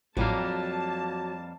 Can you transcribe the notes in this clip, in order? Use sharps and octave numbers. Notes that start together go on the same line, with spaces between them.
A1 F2 A2 F#3 G3 A#3 A5